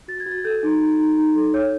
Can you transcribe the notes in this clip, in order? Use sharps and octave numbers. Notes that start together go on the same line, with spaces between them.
F#4 A6
G#6
F#4
A6
A4 G6
D#4
D#4
D#4
D#4
A4
C#5 G6